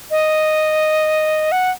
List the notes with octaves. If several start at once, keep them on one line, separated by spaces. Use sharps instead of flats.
D#5
F#5